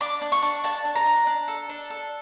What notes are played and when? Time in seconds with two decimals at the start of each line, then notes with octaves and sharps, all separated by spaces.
0.01 D4 D6
0.21 D4
0.32 C#6
0.43 D4
0.64 D4 A5
0.85 D4
0.95 A#5
1.06 D4
1.27 D4
1.48 A4
1.69 D4
1.90 A4